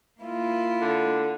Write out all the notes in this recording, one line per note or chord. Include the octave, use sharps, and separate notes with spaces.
A#3 E4 F4
D3